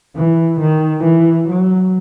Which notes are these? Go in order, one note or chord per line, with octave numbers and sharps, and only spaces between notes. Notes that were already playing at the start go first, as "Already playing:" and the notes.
E3
D#3
E3
F#3